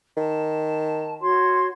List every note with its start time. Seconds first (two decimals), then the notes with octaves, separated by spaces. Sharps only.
0.17 D#3 A5
1.20 F#4 C#5 C6